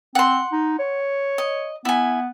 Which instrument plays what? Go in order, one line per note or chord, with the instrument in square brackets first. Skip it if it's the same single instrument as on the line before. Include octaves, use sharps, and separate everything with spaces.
[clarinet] C4 [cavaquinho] F#5 C6
[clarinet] D#4
C#5
[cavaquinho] D#5
[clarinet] B3 [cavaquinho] E4 G#5